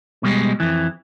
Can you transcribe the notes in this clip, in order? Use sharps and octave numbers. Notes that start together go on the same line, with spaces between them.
B2 G3 G#3
F2 E3